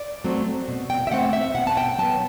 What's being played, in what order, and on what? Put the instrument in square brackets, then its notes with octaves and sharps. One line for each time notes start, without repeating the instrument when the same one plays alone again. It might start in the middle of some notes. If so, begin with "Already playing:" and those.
Already playing: [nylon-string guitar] D5
F#3 A3 C4
B2
G5
E5
A3 C4 F#5
E5
B2 F#5
A5
G5
F#3 B3 A5